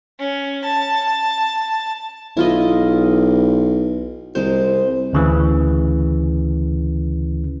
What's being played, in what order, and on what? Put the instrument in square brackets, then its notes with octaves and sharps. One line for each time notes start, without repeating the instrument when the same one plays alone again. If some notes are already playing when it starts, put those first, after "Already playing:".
[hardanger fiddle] C#4
A5
[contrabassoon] B1 [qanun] E4 F4 D#5
[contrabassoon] C2 [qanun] G#3 C5
[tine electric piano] D2 C#3 E3